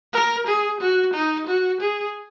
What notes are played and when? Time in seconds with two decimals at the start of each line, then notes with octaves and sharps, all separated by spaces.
0.13 A#4
0.46 G#4
0.80 F#4
1.14 D#4
1.47 F#4
1.80 G#4